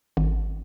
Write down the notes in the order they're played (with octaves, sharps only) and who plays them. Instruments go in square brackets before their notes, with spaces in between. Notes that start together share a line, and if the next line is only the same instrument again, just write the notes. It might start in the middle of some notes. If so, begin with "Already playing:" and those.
[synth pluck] G#1